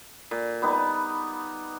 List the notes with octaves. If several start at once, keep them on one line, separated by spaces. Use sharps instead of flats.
A#2
G3 B3 D#4